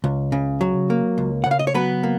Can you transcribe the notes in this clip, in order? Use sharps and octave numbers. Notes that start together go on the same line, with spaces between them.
C#2
C#3
F#3
A#3
C#2
C#3 F#5
F5
D#5
C#5
F#3 B3 B4
A#3